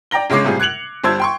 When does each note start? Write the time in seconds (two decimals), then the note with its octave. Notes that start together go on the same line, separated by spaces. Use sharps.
0.11 D5 G5 A#5 A#6 G7
0.30 G1 C#3 G#3 C#5 D6 C7
0.44 A2 C3 G3 F4 G#4
0.60 F#6 G#6 C#7 F7 F#7
1.04 G1 G3 C5 A5 E6 G#6
1.20 G5 C6 C#6